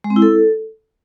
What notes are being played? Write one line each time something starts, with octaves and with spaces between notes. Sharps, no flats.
G#3
C4
E4
A4